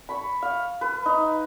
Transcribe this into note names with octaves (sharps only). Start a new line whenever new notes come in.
B5 C#6
F5
B4
D#4